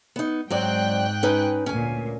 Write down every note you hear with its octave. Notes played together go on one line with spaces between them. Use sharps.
B3 D#4
G#2 F#3 C4 D5 G5 F#6
C#4 D#4 B4
D2 A#2 C#4 G#5